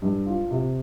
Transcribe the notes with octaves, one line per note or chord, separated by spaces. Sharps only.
G2
F4
C3